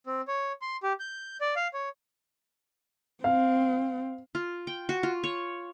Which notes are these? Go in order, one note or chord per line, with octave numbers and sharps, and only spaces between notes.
C4
C#5
C6
G4
G6
D5
F5
C#5
C4 F5
F4
G5
F#4
F4
C#5